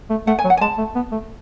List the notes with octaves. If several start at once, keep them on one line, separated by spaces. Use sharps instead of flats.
A3
A3 F#5
G#5
F#3
F#5
G#5
G#3 A5
A3
B3
A3